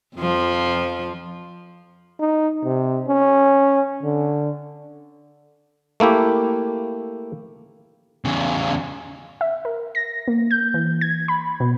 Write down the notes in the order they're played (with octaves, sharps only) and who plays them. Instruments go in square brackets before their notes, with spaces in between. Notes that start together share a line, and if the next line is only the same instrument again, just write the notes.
[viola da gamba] F2 F3
[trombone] D#4
C3
C#4
D3
[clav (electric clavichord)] A3 A#3 E4 G4
[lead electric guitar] E2 C#3
[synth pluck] E5
A#4
A#6
A#3
G6
E3
G#6
B5
B2